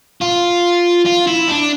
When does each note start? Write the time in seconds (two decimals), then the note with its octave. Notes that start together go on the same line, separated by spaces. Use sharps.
0.22 F4
1.06 F4
1.27 E4
1.49 D4